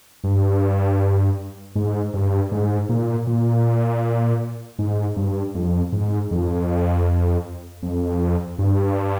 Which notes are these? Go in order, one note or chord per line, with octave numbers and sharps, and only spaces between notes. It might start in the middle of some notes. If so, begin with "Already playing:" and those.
G2
G#2
G2
G#2
A#2
A#2
G#2
G2
F2
G#2
F2
F2
G2